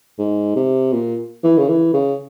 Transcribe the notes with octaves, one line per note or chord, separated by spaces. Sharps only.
G#2
C3
A#2
E3
C#3
E3
C#3